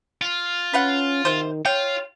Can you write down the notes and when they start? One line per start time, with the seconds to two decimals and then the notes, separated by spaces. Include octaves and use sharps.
0.22 F4
0.73 C#4 B4 F5 F#5
1.25 C3 D#3 C5
1.65 F4 C#5 G5